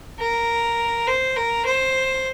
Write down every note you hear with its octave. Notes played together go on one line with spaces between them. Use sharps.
A#4
C5
A#4
C5